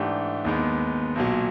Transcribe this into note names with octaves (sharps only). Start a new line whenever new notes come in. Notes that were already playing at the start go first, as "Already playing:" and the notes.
Already playing: G#2 E3 A3 D4 G4
D#2 D#3 G#3 B3
B1 A#2 F#3